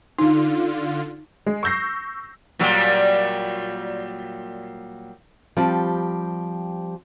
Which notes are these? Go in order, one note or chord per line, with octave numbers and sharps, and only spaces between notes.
D3 D#4 F4
G#3
C#6 E6 G6 A#6 C7
A#2 F#3 G3
F3 G3 C4 G4 A5